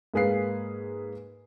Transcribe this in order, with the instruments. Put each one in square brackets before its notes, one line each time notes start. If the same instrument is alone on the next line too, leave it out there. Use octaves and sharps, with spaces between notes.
[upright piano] G#2 A#3 G#4 B4 F5 C7